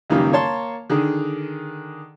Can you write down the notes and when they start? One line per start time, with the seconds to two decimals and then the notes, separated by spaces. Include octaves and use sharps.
0.10 C#2 F#2 D#3 G3 A#3
0.32 A#3 C#5 A5 C6
0.90 D3 D#3 G#4